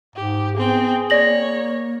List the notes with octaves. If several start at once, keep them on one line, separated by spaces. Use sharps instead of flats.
G#2 G4
B3 C4 G#4 G5
A#3 C#5 D5 A#6 F#7